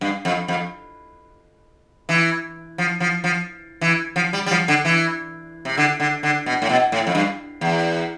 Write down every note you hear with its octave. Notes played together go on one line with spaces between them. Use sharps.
G2
F2
F2
E3
F3
F3
F3
E3
F3
G3
G3
F3
D3
E3
C3
D3
D3
D3
B2
A2
B2
A2
F2
G2
E2